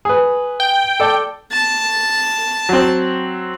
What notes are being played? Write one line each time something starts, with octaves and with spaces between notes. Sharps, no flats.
G#4 B4
G5
A4 D5 A5
A5
F#3 C4